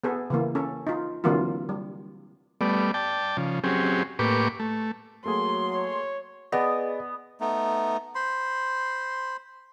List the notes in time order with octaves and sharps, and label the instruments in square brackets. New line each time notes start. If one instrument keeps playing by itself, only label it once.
[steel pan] B3 G#4 A4
C#3 E3 A#3
C#4 A4
D#4 F4
D3 E3 F#3 A#3 C4 F4
G3
[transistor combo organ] G3 A3 B3 D5
D5 G5 A5
C#3 F3
F#3 C4 C#4 G4 G#4
A2 A#3 G4 B4 C#6 D6
A3
[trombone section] F#3 [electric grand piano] A3 A#3 G#4 [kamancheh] C6
[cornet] C#5
[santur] B3 [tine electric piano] G#4 D5 D#5
[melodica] A3 B3 D#4
C5 B5 C6